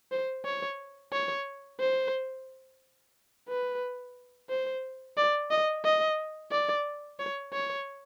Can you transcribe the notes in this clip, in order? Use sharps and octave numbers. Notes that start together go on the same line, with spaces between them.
C5
C#5
C#5
C5
B4
C5
D5
D#5
D#5
D5
C#5
C#5